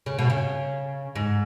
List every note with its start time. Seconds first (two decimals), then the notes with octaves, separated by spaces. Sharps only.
0.06 C#3
0.19 B2
0.30 C#3
1.16 G#2